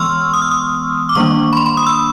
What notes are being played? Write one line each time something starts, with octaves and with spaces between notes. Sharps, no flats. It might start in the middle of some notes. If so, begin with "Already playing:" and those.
Already playing: E3 G#3 B3 C6 C#6 E6 F6
D#6
E6
D#6
D6
D#3 G3 A#3 D4 C#6
B5
C6
B5
D#6
E6